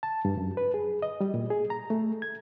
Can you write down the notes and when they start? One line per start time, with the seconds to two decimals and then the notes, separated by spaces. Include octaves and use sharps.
0.03 A5
0.25 G2
0.37 F#2
0.57 B4
0.74 G#4
1.02 D#5
1.21 G3
1.34 A#2
1.50 G#4
1.70 A#5
1.90 A3
2.22 G#6